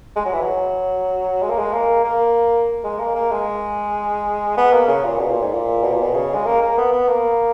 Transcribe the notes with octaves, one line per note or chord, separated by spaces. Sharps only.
G#3
F#3
E3
F#3
G#3
A#3
G#3
A#3
A#3
G#3
A#3
A#3
G#3
B3
A#3
C#3
A#2
B2
A#2
G#2
A#2
B2
A#2
B2
C#3
G#3
A#3
A#3
B3
B3
A#3